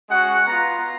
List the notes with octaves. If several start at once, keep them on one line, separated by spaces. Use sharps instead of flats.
G#3 C#4 F#4 F#5
B3 F4 A#5